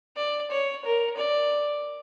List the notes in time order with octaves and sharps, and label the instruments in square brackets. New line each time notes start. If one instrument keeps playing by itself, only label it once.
[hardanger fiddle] D5
C#5
A#4
D5